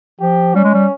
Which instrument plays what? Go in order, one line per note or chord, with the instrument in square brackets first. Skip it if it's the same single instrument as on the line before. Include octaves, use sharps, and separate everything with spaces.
[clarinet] F3 [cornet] G4
[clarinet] G3 [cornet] C#4
[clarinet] G#3
G3